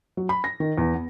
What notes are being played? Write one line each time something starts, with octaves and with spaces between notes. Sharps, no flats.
F#3
B5
A#6
D#3
E2
B3